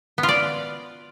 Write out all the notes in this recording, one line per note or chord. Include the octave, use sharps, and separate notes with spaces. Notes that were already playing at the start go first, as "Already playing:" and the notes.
B3
F4
D5